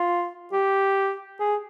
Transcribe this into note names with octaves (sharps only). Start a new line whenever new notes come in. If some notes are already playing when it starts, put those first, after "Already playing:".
Already playing: F4
G4
G#4